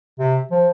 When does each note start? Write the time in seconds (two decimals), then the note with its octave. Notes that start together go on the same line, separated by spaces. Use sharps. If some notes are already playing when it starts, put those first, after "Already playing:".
0.19 C3
0.51 F3